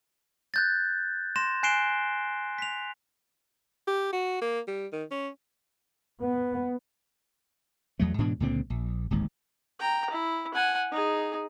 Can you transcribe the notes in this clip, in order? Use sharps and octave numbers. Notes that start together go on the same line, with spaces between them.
F#6 G6 A6
C6 A#6 E7
G#5 F#6 C7 D7 E7 G7
B6 F7
G4
F#4
A#3
G3
D#3
C#4
B3
E2 F#3 A3
G#2 B2 E3 D4
C#2 A#2 D3 C4
A#1
D1 G#1 D#2 G#2
G5 A#5
E4
F#5 G#5
D#4 G#4